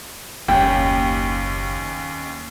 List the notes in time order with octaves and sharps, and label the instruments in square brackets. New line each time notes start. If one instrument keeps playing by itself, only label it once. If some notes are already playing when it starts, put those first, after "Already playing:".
[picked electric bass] F#1 A#3 [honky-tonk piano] D#2 C#4 [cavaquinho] G5